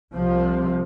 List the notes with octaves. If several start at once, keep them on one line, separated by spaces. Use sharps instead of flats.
C2 C3 F3